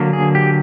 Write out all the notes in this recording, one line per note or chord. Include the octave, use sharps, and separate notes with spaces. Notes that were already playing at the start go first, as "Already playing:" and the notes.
Already playing: D3 F#3 A#3
G#4
G4